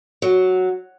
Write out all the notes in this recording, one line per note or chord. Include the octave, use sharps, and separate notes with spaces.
F#3